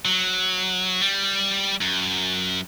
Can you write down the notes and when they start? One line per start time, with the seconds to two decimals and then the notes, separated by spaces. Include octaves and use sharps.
0.05 F#3
1.01 G3
1.81 F#2